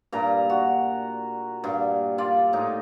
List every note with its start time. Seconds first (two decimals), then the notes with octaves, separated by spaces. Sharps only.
0.12 G2 A#2 A#5
0.50 F#4
1.64 G2 A#2
2.18 F4 D5
2.53 A2 D#4